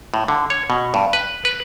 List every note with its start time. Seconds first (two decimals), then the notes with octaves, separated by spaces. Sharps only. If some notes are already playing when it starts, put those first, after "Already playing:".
0.14 A2
0.28 D3
0.50 C#5
0.70 B2
0.94 G2
1.13 B4
1.45 B4